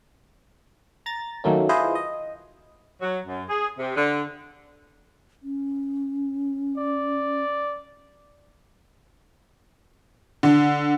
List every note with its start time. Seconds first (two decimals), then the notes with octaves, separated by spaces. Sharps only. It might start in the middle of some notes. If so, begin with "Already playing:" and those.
1.06 A#5 A6
1.44 D#3 F#3 A3 A#3 C#4
1.69 E4 F4 G#4 B4 C5 D#5
1.95 D#5
3.01 F#3
3.25 F#2
3.49 G#4
3.79 C3
3.96 D3
5.43 C#4
6.77 D5
10.43 D3